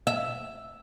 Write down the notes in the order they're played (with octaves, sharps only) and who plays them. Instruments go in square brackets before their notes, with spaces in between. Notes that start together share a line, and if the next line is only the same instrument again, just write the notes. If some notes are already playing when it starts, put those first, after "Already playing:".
[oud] E5